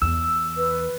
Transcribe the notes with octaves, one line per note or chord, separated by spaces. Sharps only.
E2 E6
B4